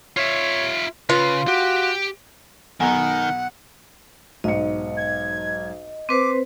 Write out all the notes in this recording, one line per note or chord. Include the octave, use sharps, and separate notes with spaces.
F4 C#5 E5
C#3 F4 B4
F#4 G4
B1 B2 D#3 F#5 G#5 A#5
B1 G#2 D#5 C#7
G#6
C4 B4 C5 D6